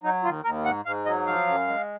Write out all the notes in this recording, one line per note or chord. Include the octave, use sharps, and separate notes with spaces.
F#3 D#4
D#2 F4
D#2 A#4
G#2 F#5
G#2 F5
F#3 D#5
F3 F5
F#2
G#3